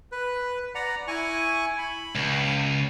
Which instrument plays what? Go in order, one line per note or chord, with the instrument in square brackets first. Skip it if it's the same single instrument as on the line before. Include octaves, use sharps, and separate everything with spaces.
[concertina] B4
D5 F#5 A#5
E4 G#5 C#6
B5
[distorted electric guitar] C#2